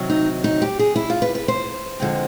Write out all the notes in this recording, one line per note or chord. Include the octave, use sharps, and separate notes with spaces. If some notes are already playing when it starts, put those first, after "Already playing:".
Already playing: C3 D#3 F#3
D#4
D#4
G4
G#4
E4
F4
B4
B4
C5
D3 F3 G#3 C4